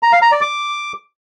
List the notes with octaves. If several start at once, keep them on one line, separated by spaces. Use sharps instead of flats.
A#5
F5
A#5
D5
D6